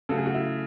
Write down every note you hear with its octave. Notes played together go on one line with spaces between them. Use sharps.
C#3 F#3 A3 A4
G#4
F#4
E4